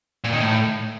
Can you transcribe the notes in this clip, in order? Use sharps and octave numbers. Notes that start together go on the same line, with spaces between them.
A#2
D#3
A2